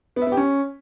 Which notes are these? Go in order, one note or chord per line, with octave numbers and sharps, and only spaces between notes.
B3
E5
B3
G4
C#4